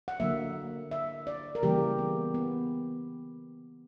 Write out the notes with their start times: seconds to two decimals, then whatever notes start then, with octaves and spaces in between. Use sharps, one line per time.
0.08 F#5
0.20 D3 F#3 A#3 E5
0.91 E5
1.27 D5
1.55 A#4
1.63 C#3 E3 G3 A#3 G4
1.99 B3
2.34 B3